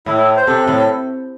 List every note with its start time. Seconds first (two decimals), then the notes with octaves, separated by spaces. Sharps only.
0.06 A2 E4
0.17 E4
0.37 C5
0.47 C3 A4
0.67 A2